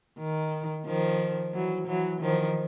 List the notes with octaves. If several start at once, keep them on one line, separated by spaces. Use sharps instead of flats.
D#3
D#3 F3
E3 F#3
E3 F#3
D#3 F3